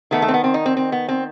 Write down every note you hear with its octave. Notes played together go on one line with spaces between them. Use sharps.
D#3 A3 B3
A3
C4
B3
C4
D#4
C4
C4
B3
C4